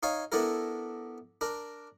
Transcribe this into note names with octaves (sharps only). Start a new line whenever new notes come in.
D#4 C#5 F5 G#5
B3 D4 E4 A4 A#4
D4 A#4